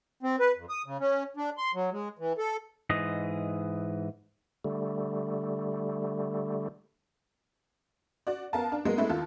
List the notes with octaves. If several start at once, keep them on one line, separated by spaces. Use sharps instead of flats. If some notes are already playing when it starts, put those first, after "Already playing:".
C4
B4
F2
D#6
C#3
C#4
D4
C6
F#3
G#3
E3
A4
G#2 E3 D#5
D3 G3 A3
F#4 D5
B3 A#4 F5 A5
D4
F#3 G#3 A#3 B3
G#3 A3 B3 E4
D#2 F4 A4